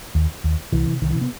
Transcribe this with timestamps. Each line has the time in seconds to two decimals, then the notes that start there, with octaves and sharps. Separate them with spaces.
0.15 D#2
0.44 D#2
0.72 C2 E3
0.87 C3
1.02 C2 D#3
1.11 E3
1.15 C3
1.21 B3